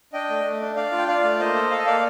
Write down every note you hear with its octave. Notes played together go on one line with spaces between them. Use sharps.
D4 D#5 G5
A3
A3
D4
D4 D5 F5
F4
G5
F4 D5 F5
A3
A#3 C5 D#5
A4
A4 F5
D#5
A#3 D5 F5